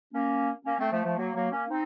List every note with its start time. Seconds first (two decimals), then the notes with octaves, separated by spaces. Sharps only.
0.14 A#3 C#4
0.66 A#3 C#4
0.79 A3 C4
0.92 F3 A3
1.05 F3 A3
1.18 F#3 A#3
1.35 F#3 A#3
1.52 A#3 C#4
1.69 C4 D#4